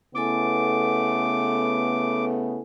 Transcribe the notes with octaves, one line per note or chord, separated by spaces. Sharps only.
C#3 A3 B3 E4 A4 G#5 D6